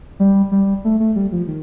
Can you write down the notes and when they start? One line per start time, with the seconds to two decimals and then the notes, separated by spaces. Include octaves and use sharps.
0.20 G3
0.51 G3
0.85 A3
1.00 A3
1.16 G3
1.32 F3
1.47 D#3